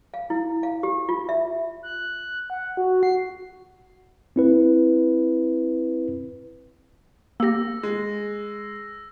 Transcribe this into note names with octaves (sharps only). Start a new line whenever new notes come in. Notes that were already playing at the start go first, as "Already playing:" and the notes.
F5
E4
F5
G4
F4
E5
F#6
F#5
F#4
C7
C4 E4 B4
A#3 G4 E6 A#6
G#3